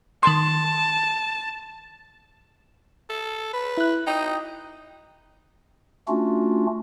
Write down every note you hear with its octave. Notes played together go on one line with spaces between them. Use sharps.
D#3 A5 C6
A4
B4
E4 F#6
D#4 G5 D#6
A3 C#4 D4 F4 F#4